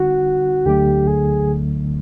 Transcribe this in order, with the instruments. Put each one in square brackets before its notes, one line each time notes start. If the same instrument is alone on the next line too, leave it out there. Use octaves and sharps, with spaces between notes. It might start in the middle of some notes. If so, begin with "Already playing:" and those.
Already playing: [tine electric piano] D3 G3 C4 D#4 [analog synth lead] F#4
[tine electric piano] D2 D3 F#3 A3 [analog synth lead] G4
[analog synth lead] G#4